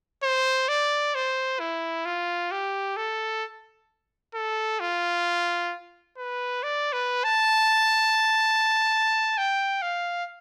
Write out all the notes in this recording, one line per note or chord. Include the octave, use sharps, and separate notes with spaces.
C5
D5
C5
E4
F4
G4
A4
A4
F4
B4
D5
B4
A5
G5
F5